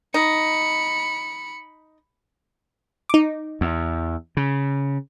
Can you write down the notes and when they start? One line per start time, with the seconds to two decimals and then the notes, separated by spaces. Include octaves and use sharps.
0.14 D#4 B5 C#7
3.09 D#4 D6
3.61 E2
4.37 C#3